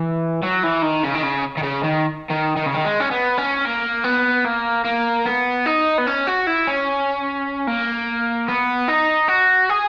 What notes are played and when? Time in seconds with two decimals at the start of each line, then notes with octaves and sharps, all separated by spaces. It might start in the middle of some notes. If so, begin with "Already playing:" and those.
Already playing: E3
0.42 F#3
0.63 E3
0.82 D#3
1.03 C#3
1.15 D#3
1.23 C#3
1.57 D#3
1.63 C#3
1.84 D#3
2.30 D#3
2.57 D#3
2.66 C#3
2.74 D#3
2.85 G#3
3.00 C#4
3.11 B3
3.38 C#4
3.65 A#3
4.04 B3
4.45 A#3
4.85 A#3
5.26 B3
5.66 D#4
5.98 B3
6.06 C#4
6.27 F#4
6.47 E4
6.67 C#4
7.67 A#3
8.48 B3
8.88 D#4
9.28 F#4
9.69 G#4